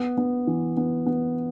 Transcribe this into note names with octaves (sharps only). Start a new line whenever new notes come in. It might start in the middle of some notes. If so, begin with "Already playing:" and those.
Already playing: B3
B3
E3
B3
B3